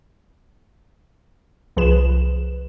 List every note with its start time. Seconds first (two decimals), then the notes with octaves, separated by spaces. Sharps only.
1.77 C2 F3 G#4 B4 E7